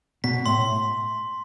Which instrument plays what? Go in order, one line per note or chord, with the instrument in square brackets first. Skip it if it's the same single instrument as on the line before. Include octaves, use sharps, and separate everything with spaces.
[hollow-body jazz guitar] B2 [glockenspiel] B6
[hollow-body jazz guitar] A2 [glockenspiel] C6